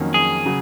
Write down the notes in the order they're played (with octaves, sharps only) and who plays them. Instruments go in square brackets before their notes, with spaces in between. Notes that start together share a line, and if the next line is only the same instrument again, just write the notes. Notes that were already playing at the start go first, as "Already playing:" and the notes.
Already playing: [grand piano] F2 D#3 F#3 A#3 C#4
[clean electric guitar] G#4
[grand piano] C#3 F#3